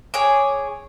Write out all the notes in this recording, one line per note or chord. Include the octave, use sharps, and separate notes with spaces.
G#4 C#5 D6